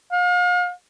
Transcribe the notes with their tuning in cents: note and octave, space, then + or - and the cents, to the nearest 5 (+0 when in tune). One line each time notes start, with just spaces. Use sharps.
F5 +40